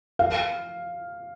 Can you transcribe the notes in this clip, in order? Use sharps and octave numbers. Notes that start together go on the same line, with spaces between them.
F5